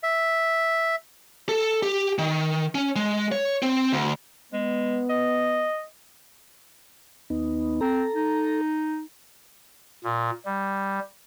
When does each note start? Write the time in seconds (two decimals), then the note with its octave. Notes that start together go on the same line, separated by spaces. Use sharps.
0.03 E5
1.49 A4
1.82 G4
2.18 D#3
2.75 C#4
2.96 G#3
3.32 C#5
3.62 C4
3.92 D2
4.53 G#3 B3
5.09 D#5
7.30 D#2 B3 D#4
7.81 C4 A4 A#5
8.14 D#4
10.04 A#2
10.45 G3